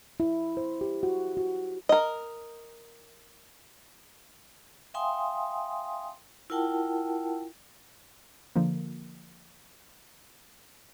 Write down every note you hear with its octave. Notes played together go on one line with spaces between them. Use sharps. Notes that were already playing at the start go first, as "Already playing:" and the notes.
E4
C5
G4
F#4
F#4
A#4 D#5
E5 F5 G5 G#5 C6 D#6
E4 F4 A#4 F#5 G5 A5
D3 F3 A#3